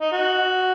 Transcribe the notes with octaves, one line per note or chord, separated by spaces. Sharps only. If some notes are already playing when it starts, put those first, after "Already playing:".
D#4
F#4